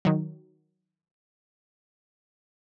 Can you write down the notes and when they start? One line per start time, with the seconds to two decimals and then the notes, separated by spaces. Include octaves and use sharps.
0.05 D#3 F#3